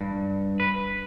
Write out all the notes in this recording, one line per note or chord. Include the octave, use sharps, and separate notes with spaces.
G2
B4